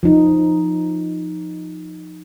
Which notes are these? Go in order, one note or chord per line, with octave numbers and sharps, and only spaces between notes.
F3 D#4